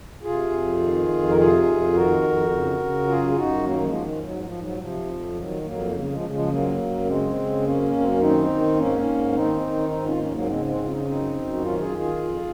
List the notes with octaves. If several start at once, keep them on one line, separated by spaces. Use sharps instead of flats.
C3 F4 G#4
F2
D#3
F2
A#4
C3 F4 G#4
F2
D#3 F#4 A#4
F2
C#3
C#3
F#2 F4 G#4
G#4
F#2 D#4 F#4
D#3 F#3 A#3
F3 G#3
D#3
G#2 F#3
F3
G#2
F#3
C3 F3
F2
D#3 F#3
F2 F#3 A#3
C#3 F#3
F#3
F3 G#3
C#3
F3 G#3
F#2 F#3 A#3
F#2
C#3 G#3 C4
C#3
F#2 A#3 C#4
F#2
C4
C#4
D#3 C4 D#4
D#3
G#2 A#3 C#4
G#2
D#3 C4 D#4
D#3
G#2 C4 D#4
C#4 F4
G#2 A#3 C#4
F#3 A#3
C#3 G#3 C4
G#3 C4
C#3
F4
D#4
C#4
F#2 C4 D#4
F#2
F#4
D#3 C#4 F4
F4 G#4
D#3
F4 G#4
F2